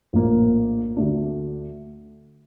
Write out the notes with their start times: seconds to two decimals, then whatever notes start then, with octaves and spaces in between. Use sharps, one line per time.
0.13 A#1 A2 F3 A#3
0.96 D2 D3 A3 D4